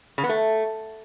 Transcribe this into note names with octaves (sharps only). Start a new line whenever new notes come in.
C#3
B3
A3